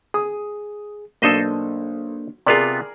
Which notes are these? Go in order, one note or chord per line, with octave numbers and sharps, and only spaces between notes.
G#4 D#6
B1 A#3 D4 A4 C5 D#5 D#6 E6
C3 B3 F4 G#4 A#4 D5